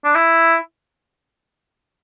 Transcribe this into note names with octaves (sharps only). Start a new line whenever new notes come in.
D4
E4